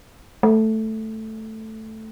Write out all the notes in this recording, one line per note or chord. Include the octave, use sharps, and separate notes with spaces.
A3